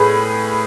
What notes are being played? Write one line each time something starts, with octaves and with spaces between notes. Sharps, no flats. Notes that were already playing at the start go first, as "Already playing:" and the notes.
Already playing: A2 G#4 B4